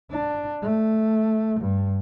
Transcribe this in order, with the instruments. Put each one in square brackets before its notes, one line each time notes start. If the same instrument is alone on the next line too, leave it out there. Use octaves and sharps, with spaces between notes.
[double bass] D4
A3
G2